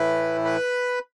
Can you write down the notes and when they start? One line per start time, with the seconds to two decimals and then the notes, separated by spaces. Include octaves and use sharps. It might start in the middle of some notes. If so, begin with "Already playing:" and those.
Already playing: A2 E3 A3 E4 B4 B5
0.45 B4 B5